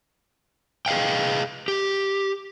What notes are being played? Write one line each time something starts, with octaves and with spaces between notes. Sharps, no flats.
G#4 D#5 F5 G5
G4